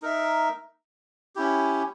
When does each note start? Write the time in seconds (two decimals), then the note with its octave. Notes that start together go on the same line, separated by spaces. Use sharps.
0.02 D#4 A#4 E5
1.36 C#4 E4 G4